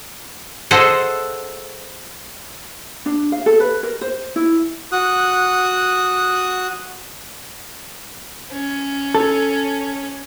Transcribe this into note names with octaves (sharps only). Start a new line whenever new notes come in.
G#4 A4 C5 D#5 E5 F#5
D4
F5
A4
B4
A#4
C5
E4
F#4 D#6 F#6
C#4
A4